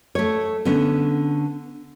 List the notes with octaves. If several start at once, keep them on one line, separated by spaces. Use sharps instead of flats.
A3 C#5
D3 B3 C#4